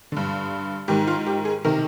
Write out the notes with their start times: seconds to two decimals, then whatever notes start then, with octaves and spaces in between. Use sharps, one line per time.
0.12 G2 D3
0.88 G#2 D#3 G4
1.07 F4
1.26 G4
1.45 G#4
1.65 C3 D#3 A#4